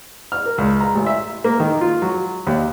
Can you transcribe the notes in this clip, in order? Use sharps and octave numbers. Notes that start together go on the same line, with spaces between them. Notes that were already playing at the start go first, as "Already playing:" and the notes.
F6
A#4
C#2
A#5
A1
E5
A#3
D#3
F4
F#3
D#2